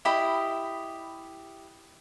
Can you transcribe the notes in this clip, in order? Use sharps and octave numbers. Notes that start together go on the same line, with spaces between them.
E4 G4 D#5 B5